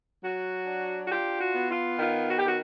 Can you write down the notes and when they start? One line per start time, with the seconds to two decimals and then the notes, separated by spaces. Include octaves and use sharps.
0.24 F#3 F#4
0.67 D4
1.05 F#4
1.12 F4 G4
1.41 F#4
1.55 B3
1.70 F4
1.99 D#3 F4
2.29 F#4
2.39 G4
2.44 D#3 F#4